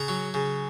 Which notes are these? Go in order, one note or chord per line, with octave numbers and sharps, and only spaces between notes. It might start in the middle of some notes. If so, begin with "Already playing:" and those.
Already playing: C#3 F#5 A#5
F#3
C#3